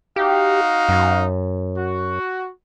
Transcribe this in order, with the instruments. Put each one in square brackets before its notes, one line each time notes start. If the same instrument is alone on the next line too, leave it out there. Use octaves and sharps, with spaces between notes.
[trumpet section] D#4 F#4 F5 [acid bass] G4
[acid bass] F#2
[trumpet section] F#4